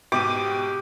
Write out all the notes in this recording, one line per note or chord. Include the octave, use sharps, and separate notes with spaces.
G#2 B2 G4 D6 D#7